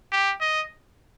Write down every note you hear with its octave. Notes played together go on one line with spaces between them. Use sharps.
G4
D#5